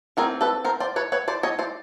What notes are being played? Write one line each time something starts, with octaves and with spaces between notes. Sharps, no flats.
E3 A3 C4 G#4 A#4
A4 B4
A#4 C5
C5 D5
B4 C#5
B4 C#5
C5 D5
C#5 D#5
C5 D5